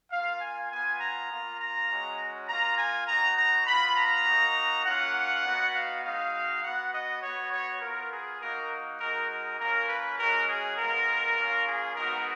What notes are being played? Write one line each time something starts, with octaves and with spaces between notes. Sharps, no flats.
A#3 F4 F5
G#5
B3 F4 G#5
A#5
A#3 F4
A#5
G#3 C#4 F#4
A#3 F4 A#5
G#5
B3 D#4 F#4 A#5
A#5
B3 F4 B5
A#5
A#3 D#4 F#4
A#3 C#4 F4 F#5
B3 D#4 F#4
F5
G#3 D#4 F#4 F5
B3 F#4 F#5
D#5
B3 F#4 C#5
C#5
B3 F4 A#4
G#4
A#3 D#4 F#4 A#4
G#3 D#4 F#4 A#4
A#4
A#3 C#4 F4 A#4
B4
G#3 C#4 F#4 A#4
G#4
G#3 B3 F4 A#4
A#3 C#4 F4
G#4
G#3 B3 D#4 F#4 A#4